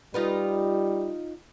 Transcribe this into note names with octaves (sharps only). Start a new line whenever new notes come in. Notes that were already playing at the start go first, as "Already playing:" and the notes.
G3 D#4 F4 B4